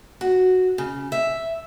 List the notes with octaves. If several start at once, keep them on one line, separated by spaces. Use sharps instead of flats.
F#4
C#3
E5